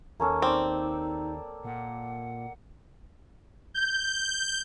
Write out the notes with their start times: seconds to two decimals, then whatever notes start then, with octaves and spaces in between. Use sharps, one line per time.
0.20 D#2 A#3 C#4 A4
0.42 C4 D#4 D5 D6
1.65 A#2 F#5
3.74 G6